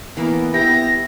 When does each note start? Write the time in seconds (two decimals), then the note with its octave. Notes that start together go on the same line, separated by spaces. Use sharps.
0.17 E3 A#3 B3
0.54 E4 G4 A#6